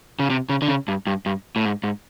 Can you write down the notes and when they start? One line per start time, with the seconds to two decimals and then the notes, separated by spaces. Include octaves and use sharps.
0.19 C#3
0.30 C3
0.49 C#3
0.62 D3
0.68 C#3
0.88 G2
1.07 G2
1.26 G2
1.56 A2
1.65 G#2
1.84 G#2